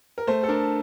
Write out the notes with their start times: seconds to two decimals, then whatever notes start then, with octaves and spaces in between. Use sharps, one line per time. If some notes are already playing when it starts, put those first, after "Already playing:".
0.18 A#4
0.27 A3 C5
0.43 A4
0.48 D4 A#4